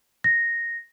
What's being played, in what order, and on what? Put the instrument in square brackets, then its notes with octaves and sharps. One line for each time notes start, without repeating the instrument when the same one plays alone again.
[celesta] A#6